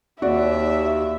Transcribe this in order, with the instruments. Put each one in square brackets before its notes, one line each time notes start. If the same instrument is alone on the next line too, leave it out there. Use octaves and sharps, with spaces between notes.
[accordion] D#2 [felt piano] F#4 D5 [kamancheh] E5